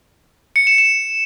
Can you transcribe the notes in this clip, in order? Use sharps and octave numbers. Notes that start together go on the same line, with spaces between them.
C#7
E7
E7